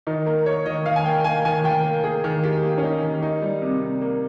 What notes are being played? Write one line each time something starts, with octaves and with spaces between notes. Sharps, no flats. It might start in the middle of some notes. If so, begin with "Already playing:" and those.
D#3 D#4
A#3 A#4
A#3 C#5
D#3 D#5
D#3 F5
G#5
A#3 G5
A#3 G#5
D#3 G#5
D#3 G5
A#3
A#3 G#4
D#3
D#3 G4
A#3
C#4
A#3 D#4
D#3
A#3 D#4
G3
C3
C3
A#3